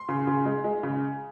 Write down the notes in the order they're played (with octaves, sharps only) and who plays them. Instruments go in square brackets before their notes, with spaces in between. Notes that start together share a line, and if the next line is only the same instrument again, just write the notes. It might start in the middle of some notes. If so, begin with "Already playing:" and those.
Already playing: [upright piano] C6
C#3
C#3
G#3
G#3
C#3